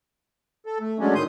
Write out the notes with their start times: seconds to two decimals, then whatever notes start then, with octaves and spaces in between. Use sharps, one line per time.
0.66 A4
0.80 A3
1.00 F#3 G#3 A3 C#4 D4
1.15 A2 D#3 C6 D#6 G6